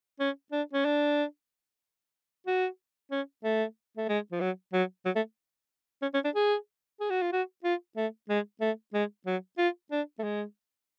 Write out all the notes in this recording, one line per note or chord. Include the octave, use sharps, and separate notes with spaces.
C#4
D4
C#4
D4
F#4
C#4
A3
A3
G#3
F3
F#3
F#3
F#3
A3
C#4
C#4
D4
G#4
G#4
F#4
F4
F#4
F4
A3
G#3
A3
G#3
F#3
F4
D4
A3
G#3